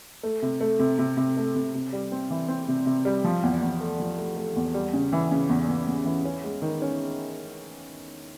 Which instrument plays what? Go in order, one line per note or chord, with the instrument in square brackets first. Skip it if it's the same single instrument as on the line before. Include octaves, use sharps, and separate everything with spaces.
[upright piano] A3
C3
A3
C3
C3
C3
A3
C3
C3
G3
C4
E3
C4
C3
C3
G3
F3
E2
E2
A3
F3
A3
A3
E2
G3
C#3
E3
C#3
E2
E2
E2
E3
C#4
G#3
D#3
C#4